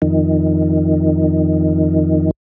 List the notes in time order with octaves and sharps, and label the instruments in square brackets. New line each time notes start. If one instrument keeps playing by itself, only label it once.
[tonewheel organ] F2 D#3